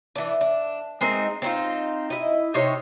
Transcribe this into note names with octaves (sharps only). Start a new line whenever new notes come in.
E3 D4
D4
G#3 C4 D#4 A#4
C4 D#4 F4
E4 D#5
C3 D#4 C5 C#5